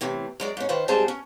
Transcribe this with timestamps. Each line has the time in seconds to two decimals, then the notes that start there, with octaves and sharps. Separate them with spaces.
0.01 A2 C3 E3
0.40 F#2 G#3 D5
0.57 G#2 C#4
0.69 D#3 F4 B4 C5
0.88 G#2 G3 C4 G#4 C5 A5
1.08 C#4